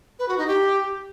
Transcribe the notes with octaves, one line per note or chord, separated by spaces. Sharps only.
B4
F#4
D#4
G4